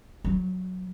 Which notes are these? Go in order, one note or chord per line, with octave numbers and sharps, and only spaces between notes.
F#3